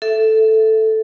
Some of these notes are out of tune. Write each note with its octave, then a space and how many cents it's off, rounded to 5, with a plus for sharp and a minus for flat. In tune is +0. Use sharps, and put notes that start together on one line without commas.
A4 +0 E5 +5